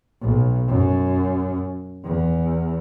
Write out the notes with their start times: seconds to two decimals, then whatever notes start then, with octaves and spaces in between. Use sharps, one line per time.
0.22 B1
0.68 F#2
2.04 E2